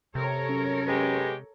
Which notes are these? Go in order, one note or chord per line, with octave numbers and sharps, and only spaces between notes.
C3 A4 A#4 C#5
F#2
G#3 B3 G4